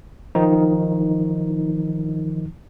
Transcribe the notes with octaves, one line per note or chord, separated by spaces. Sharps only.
D#3 F3 D#4